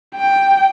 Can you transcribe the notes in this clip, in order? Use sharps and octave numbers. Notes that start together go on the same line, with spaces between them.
G5